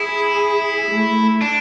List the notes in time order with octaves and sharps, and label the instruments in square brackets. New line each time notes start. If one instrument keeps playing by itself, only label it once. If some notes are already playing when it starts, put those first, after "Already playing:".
Already playing: [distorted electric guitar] E4 [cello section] G#4
[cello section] A3
[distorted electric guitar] D4